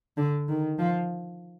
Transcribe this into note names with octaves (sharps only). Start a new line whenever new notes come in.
D3
D#3
F3